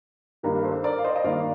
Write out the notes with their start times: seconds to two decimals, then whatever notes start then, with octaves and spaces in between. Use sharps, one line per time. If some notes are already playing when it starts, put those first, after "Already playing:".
0.43 G2 D#3 A#3 G4 A#4
0.63 A4 C5
0.84 A#4 D5
0.99 F5
1.04 C5 D#5
1.16 D#5
1.24 G2 D#3 A#3 D5 F5